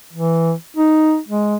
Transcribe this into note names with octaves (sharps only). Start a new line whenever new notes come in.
E3
D#4
G#3